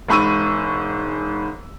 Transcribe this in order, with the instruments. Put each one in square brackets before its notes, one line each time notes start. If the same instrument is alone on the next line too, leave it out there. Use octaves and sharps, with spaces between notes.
[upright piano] E1 G#2 B5 C#6 E6 D#7